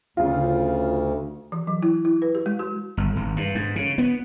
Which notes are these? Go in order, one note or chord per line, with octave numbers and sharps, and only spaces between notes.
D2 C#3 F4
E3
F#3
E4
E4
B4
G4
G#3
F#4
G1
G#1
G2
G#2
C#3
B3